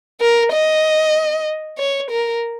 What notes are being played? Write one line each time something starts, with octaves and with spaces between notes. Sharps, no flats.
A#4
D#5
C#5
A#4